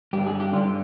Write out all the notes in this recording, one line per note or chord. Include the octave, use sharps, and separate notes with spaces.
G2 D3 G4
G#4
G4
G2 D3 F4